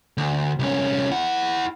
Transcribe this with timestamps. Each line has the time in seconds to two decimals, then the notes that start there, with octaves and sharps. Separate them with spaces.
0.18 D2
0.59 C2 C#4
1.11 E4 F#5